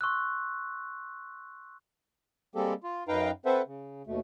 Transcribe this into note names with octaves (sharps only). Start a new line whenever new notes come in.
C6 C#6 E6 F#6
G3 G#3 A#3 C4 G4 A4
F4
F#2 D#4 B4 F5 G5 A#5
C4 A4 B4 C5 E5 F#5
C#3
D#2 B2 A3